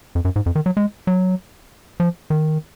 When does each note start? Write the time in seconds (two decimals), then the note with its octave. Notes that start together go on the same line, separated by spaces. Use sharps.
0.15 F2
0.25 F#2
0.36 G#2
0.46 F2
0.55 D#3
0.66 F#3
0.77 G#3
1.07 F#3
2.00 F3
2.30 D#3